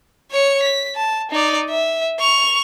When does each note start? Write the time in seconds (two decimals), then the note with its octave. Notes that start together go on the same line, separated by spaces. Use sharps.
0.31 C#5 C#7
0.63 B6
0.95 A5
1.31 D#4 D5
1.70 E5
2.19 C#6 F7